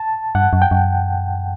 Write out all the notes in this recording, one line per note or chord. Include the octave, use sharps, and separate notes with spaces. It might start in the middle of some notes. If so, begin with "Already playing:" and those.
Already playing: A5
G2 F#5
F#2
G5
F#2